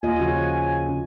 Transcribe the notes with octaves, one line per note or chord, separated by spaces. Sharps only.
D#2 F4 D#5 G#5
C#3 F3 C#4 F#4